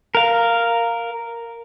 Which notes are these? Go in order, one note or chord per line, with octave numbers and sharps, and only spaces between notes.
A#4 F5